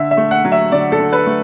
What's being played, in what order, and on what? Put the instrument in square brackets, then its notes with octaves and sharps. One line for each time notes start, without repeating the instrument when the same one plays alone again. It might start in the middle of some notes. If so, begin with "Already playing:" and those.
Already playing: [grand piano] D3 E5
E5
A3
F#5
F#3
E5
D3 D5
A4
D3
B4
A3